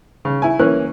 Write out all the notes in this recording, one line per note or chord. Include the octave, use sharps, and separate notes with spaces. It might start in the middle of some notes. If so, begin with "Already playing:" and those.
C#3
E4 G#5
E3 A#3 C#4 F#6